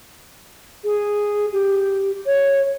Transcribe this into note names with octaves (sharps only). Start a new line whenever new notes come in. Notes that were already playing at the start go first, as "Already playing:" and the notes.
G#4
G4
C#5